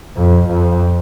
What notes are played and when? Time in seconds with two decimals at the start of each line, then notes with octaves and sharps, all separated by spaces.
0.17 F2
0.49 F2